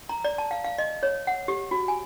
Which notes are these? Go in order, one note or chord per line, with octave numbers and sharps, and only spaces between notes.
A#5
D5
A5
F5
F5
D#5
C#5
F#5
G4
F#4
G#5